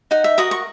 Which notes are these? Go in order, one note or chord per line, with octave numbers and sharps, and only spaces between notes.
D#4 F#5
E5
F#4 A#4 D#6
C#6